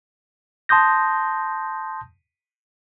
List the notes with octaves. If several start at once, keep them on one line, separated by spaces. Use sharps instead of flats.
A5 C6 D#6 G6 A#6